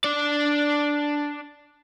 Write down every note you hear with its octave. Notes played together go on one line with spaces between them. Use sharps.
D4 D5